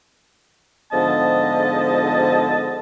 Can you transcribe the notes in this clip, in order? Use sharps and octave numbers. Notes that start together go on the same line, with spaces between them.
G#2 D3 F3 B3 D#5 A5